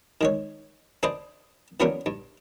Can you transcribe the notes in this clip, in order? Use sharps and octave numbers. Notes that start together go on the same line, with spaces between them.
D#3 G#3 C#5
D4 G#4 B4 C5 D#5 A5
E3 F#3 B3 C#4 D4 A#4
G2